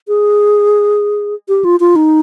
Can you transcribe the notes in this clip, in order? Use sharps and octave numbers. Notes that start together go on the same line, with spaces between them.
G#4
G4
F4
F4
D#4